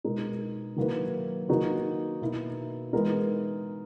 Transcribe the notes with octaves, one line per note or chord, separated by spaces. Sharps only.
B2 G#3 D#4 A#4
D#3 F#3 A#3 E4 B4
D#3 A#3 D#4 F#4 B4
B2 A#3 E4
E3 G#3 B3 D#4 A#4